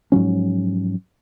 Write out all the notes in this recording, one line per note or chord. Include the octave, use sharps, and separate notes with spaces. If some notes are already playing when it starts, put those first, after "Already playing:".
G#2 F3 F#3 C#4